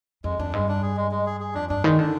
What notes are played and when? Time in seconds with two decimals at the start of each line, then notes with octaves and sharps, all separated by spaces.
0.24 F2 G#3
0.39 F2 D4
0.53 G2 G#3
0.68 D4
0.83 G#4
0.97 G#3
1.11 G#3
1.26 G#4
1.40 G#4
1.54 F2 D4
1.69 G2 D4
1.83 D#3 G#3
1.99 D3 D4